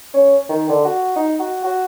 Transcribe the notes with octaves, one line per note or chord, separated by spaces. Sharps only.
C#4
D#3
D3
F#4
D#4
F#4
F#4